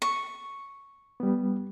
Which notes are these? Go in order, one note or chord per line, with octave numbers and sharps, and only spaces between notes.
C#6
G3 B3